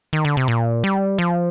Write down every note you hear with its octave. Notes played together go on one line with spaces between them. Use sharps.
D#3
D3
C3
A#2
G3
F3